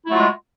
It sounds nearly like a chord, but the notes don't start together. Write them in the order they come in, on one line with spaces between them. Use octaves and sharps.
E4 A3 F#3 F4 G#3